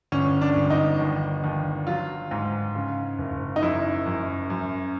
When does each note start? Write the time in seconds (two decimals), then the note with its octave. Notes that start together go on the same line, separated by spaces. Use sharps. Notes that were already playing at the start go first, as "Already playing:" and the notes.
0.12 G1 C#4
0.41 D4
0.55 G1
0.70 D#4
1.00 D#2
1.44 D#2
1.87 F#3 F4
2.31 G#2
2.75 C#3
3.18 F#1
3.56 D#4
3.62 F#2 E4
4.06 F#2
4.50 F#2